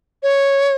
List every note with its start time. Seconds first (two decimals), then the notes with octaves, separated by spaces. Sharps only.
0.23 C#5